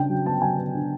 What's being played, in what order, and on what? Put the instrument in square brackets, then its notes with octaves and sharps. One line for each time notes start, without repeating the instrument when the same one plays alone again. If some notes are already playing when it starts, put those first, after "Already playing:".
Already playing: [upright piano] C#3 D4 G5
F#3
B3 A5
F#3 G#5
B3
D4